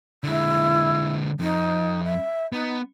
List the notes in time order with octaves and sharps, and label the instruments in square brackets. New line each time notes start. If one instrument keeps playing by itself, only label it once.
[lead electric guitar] D3 G#3 [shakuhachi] E4
[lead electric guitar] F2 [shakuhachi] D#4
[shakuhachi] E5
[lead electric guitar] B3 [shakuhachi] D#4